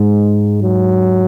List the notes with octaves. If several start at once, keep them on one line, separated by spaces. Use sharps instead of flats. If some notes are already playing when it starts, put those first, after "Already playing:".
Already playing: G#2 G#3
F#3